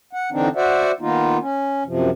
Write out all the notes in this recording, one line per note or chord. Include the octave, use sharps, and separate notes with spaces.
F#5
D3 E3 C4 D4 D#4
F#4 C5 D5 E5 F#5
D#3 A#3 B3 D#4 F4
C#4
F#2 C3 F3